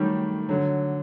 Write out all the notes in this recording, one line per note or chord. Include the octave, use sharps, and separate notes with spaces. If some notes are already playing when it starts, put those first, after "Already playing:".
Already playing: D#3 F#3 G3 A3
D3 F#3